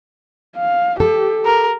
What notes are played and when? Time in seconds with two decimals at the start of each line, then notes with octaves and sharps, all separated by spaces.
0.56 F5
1.00 G4 A4
1.45 A#4